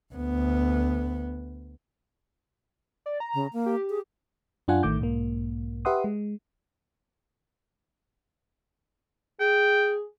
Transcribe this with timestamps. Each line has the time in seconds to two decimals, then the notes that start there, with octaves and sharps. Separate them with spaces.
0.14 D2 B3
3.06 D5
3.20 A#5
3.34 C#3
3.53 A#3
3.66 G4
3.90 G#4
4.68 F#2 D4 F4 F#5 G#5
4.83 A1 D#3 A3 D6 G6
4.99 B1 G#2 A#3
5.85 G4 B4 E5 F#5 C6 D#6
6.04 G#3
9.40 G#4 G5